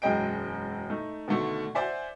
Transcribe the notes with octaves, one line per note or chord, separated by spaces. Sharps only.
E1 F#2 G#3 D#5 G5 D7
A3 D#4
B2 D3 D#3 A3 D4 A4
C5 D5 E5 F#5 G#5